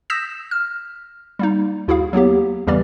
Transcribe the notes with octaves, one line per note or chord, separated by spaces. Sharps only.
D#6 E6 G6 A#6 B6 E7
F6
G3 A#3 D#4
D#2 E4 F#4 G#4 F5
F#3 A#3 B3 G4
E2 C#3 E3 G3 G4 D5